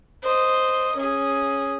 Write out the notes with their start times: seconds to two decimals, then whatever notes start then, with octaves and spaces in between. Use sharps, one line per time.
0.24 C5 D#5
0.97 C#4 G#4